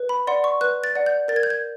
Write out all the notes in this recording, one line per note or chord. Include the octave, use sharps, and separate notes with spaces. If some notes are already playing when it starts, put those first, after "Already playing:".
Already playing: B4
B5
D5 F#5 C6
C#6
B4 F#6
A6
D5 F#5
G6
A#4 A6
G#6
G6
G#6